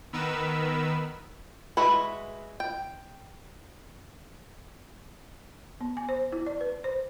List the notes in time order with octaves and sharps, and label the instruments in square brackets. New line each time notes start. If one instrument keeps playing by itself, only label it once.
[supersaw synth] D#3 B3 A#4 B4 E6
[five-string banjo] G#3 E4 F#4 B4
G5
[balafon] B3
G#5
C5
E4
D5
B4
C5